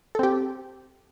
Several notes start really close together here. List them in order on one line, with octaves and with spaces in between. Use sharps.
A4 C4 G4